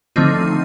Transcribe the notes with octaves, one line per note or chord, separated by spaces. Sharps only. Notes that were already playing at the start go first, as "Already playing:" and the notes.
D3 F3 A3 C4 D#4